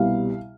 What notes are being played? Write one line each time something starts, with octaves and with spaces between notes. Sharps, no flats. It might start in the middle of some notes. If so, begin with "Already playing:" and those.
Already playing: C2 B2 G3 F5